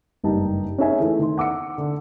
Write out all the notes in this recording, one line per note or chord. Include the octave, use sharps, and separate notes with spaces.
F#1 G2 D#4 G4 A5
C#4 D#4 G#4 E5 G#5
E3 A3
D#3 C6
F#5 D6 E6 C#7
D3